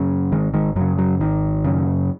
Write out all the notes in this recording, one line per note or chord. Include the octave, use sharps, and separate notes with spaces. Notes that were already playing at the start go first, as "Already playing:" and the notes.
Already playing: F#2 C#3
G#1 D#3 G#3
D#3 G#3
F#2 C#3 F#3
F#3
G#1 D#3
F#2 C#3